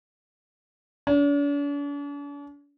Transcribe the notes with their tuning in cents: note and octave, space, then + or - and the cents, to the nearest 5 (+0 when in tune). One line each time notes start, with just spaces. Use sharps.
D4 -45